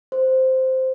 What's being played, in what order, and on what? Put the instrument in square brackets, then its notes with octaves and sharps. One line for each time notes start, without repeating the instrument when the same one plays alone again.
[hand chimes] C5